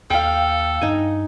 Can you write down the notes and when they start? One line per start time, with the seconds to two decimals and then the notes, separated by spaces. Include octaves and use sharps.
0.10 D#2 A4 F5 G5
0.81 G2 D#4 G#5